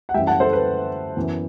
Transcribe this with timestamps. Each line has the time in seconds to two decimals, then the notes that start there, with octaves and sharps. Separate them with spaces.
0.09 F#5
0.14 F#2 E3 G3 E5 G5
0.27 F#5 A5
0.40 A4 C5
0.53 B4
1.16 F#2 E3 B3